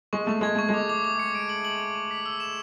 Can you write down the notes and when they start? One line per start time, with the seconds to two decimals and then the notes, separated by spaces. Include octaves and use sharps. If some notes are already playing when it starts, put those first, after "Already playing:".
0.13 G#3 C#6
0.27 A3 C#6
0.41 G#3 G#6
0.55 A3 C#6
0.69 G#3 D6
0.89 D6
1.04 D6
1.19 C#7
1.35 D7
1.49 F#7
1.65 F#7
1.80 F#7
1.95 C#6
2.11 B6
2.26 E6
2.40 E7